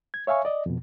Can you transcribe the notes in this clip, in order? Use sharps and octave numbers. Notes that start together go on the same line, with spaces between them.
G#6
C#5 E5 F5 G#5 C#6
D5 D#5
F2 B2